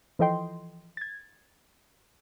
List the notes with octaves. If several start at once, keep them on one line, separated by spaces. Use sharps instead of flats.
E3 F3 A4 D#5 G5 C6
G#6 A6